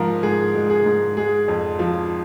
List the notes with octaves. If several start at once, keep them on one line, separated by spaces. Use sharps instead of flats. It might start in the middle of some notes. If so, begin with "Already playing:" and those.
Already playing: G#2 F3 G#3 A#4
G#2 G#4
G#3
G#4
G#2
G#3 G#4
F2
F3